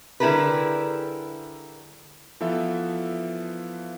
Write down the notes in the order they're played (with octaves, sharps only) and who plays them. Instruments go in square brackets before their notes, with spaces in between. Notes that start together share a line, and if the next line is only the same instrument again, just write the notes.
[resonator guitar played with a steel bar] D3 G3 E4 G#4 A#4 B4
[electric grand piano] E3 F3 B3 A4 E5